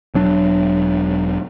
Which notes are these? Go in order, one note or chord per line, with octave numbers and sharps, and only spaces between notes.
E1 F#3 D4